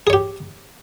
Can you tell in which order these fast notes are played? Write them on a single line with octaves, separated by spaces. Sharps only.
G#4 C#5 G4